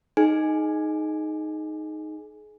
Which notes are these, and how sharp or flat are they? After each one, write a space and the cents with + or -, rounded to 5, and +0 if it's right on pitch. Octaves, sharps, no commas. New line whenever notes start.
D#4 +0 G#4 +30 G#5 +0